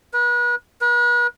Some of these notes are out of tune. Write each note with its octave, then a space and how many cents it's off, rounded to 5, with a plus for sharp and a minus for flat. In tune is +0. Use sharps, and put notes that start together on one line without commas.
B4 -35
B4 -40